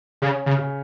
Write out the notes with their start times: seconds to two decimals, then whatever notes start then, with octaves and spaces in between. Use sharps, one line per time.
0.22 C#3 C#4
0.46 C#3
0.57 C#3